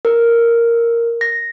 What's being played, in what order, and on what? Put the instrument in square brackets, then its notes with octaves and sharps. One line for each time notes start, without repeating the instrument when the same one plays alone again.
[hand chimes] A#4
A#6